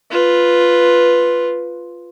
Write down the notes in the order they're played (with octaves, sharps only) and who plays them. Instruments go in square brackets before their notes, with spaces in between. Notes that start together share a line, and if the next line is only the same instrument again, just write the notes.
[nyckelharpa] F4 B4